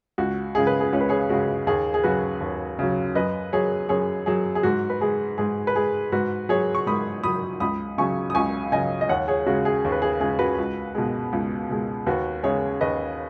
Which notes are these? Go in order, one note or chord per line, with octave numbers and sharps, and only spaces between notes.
C#2 F#4
C#3 G#3 G#4
B4
G#4
C#2 C#5
B4
G#4 C#5
C#3 G#3 F#4
D#2 G#4
G#4
C#3 F#3 F#4 B4
D#2
C#3 F#3
F#2 B4 D#5
F#3 G#4 C#5
F#2 G#4 C#5
F#3 G#4
G#4
G#2 F#4
B4
G#3 G#4
G#2 G#4
B4
G#3 G#4
G#2 F#4 B4
F#3 G#4 C#5
C#6
G#2 B5 D#6
F#3 B5 D#6
C#2 B5 D#6
C#3 F#3 G#5 C#6
D#6
C#2 G#5 C#6
C#3 F#3 D#5 G#5
D#5
D#2 C#5 F#5
G#4 C#5
C#3 G#3 F#4
G#4
D#2
B4
G#4
C#3 G#3 G#4
F#4 B4
C#2
B2 G#3
C#2
B2 G#3
D#2 F#4 B4
C#3 G#3 G#4 C#5
D#2 B4 D#5